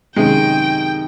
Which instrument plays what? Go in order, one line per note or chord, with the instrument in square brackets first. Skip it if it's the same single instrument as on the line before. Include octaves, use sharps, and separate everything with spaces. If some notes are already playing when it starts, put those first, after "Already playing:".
[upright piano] F#2 C3 D#3 [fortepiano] G#3 [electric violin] G5